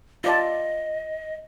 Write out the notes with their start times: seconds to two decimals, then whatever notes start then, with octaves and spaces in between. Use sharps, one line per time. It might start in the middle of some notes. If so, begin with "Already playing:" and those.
0.24 F4 D5 D#5 A5